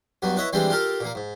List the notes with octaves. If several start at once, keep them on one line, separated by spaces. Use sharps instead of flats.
G2 F#3 B3
E4 B4 C#5 D#5 E5
E3 G3 G#3 C4 D4
F4 G4 A4 A#4
A#2 A#3
G#2